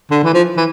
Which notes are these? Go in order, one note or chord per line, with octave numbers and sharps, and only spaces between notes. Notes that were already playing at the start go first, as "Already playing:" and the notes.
D3
E3
F3
E3